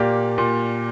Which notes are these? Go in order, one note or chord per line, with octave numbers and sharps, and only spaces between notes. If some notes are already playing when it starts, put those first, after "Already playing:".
Already playing: A#2 A#3 G4 D5
A#2